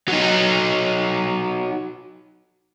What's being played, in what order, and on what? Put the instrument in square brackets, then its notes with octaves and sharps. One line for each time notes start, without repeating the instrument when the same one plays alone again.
[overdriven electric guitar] F#3 D#4